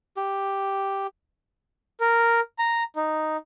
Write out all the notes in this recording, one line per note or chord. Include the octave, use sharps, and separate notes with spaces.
G4
A#4
A#5
D#4